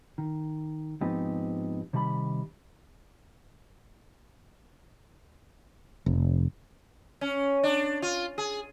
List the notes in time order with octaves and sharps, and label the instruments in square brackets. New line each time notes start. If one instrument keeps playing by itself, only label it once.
[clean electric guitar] D#3
G#2 F3 B3 C4 D#4 G4
C3 D#3 G3 A5 B5
[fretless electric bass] F1
[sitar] C#4
D4
F4
G#4